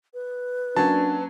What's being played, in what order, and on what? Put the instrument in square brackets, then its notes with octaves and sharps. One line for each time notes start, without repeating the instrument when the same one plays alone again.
[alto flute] B4
[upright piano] F#3 A#3 C#4 [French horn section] D4 [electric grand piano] A5